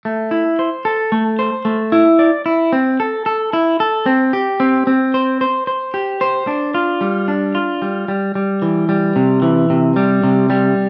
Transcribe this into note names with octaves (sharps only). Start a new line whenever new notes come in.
A3
E4
C5
A4
A3
C5
A3
E4
D5
E4
C4
A4
A4
E4
A4
C4
G4
C4
C4
C5
C5
C5
G4
C5
D4
F4
G3
D4
F4
G3
G3
G3
E3
G3
C3
E3
C3
G3
C3
G3